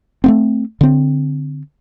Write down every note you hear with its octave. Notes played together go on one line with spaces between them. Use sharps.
A3 B3 C4
D3 C4